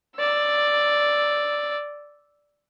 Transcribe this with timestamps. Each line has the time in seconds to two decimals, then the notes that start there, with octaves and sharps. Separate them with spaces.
0.17 D5 E6